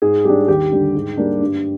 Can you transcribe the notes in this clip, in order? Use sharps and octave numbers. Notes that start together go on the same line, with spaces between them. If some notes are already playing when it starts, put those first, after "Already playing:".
G#2 G#4
G3 D4 G4
D#2 G4
D3 G3 D4
G#2
G3 A#3 D4
G2